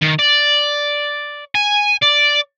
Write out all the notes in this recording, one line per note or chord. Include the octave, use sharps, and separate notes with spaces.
D#3
D5
G#5
D5